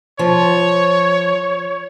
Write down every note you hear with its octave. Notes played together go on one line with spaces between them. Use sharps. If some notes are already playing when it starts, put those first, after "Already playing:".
F3 C#5